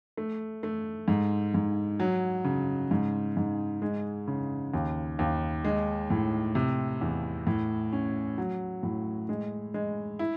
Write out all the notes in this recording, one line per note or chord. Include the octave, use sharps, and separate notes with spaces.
A3
A3
G#2
G#2
F#3
C#3
G#2
G#2
G#3
C#3
D#2
D#2
G#3
A2
C3
E2
A2
C#4
F#3
A2
G#3
G#3
E4